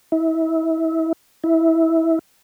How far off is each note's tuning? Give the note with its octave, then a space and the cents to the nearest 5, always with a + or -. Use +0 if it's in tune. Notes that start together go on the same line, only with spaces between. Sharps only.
E4 -30
E4 -15